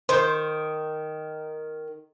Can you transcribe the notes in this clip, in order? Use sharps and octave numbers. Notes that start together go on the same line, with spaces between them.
D#3 C5